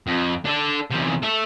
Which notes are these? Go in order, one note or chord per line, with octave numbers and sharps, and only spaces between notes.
F2
D4 A4
E2 C3
A4 E5